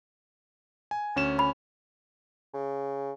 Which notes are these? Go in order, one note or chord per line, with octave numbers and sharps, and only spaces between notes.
G#5
D2 C#4 E7
B5
C#3